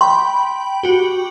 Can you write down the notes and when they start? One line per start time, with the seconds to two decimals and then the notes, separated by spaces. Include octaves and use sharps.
0.01 G5 B5 C6
0.83 F#4 G4